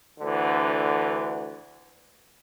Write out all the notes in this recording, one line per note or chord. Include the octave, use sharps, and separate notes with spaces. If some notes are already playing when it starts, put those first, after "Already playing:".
D2 D3 E3